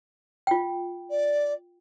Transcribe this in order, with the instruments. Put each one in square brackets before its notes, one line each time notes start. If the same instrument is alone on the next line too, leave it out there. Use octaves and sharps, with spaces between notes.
[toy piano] F4 G5
[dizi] D5